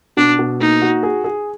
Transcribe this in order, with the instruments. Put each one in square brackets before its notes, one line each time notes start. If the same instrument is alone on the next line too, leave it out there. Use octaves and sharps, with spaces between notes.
[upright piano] B2 [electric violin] D4
[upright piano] B2
[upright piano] A#3 [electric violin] D#4
[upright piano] F#4
G#4
G#4